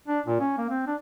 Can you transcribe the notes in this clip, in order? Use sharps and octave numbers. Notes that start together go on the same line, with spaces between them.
D4
A#2
C#4
A#3
C4
D4